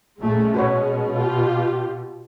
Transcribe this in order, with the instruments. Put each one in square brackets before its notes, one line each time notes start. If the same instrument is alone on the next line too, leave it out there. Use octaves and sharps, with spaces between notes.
[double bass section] A#2 A3 [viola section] G#3 C#4
[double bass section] B2 [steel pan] F#4 B4 C#5
[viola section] F4 G4